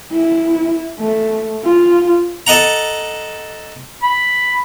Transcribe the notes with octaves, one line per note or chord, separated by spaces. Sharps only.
E4
A3
F4
A4 D#5 F#5 A#5
B5